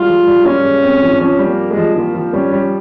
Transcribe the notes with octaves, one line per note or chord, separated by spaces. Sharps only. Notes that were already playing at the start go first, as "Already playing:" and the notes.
Already playing: G3 G#3 F4
F3
G3
A#3 C#4
G#3
C4
F3
D#3
F3 C#4
G3
A#3
G#3
F3
D#3 A#3
F3
G3 C#4
G3